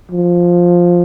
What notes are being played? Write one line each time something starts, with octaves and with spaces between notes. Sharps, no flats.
F3